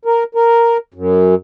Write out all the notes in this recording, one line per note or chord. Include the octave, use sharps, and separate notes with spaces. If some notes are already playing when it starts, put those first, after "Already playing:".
A#4
A#4
F#2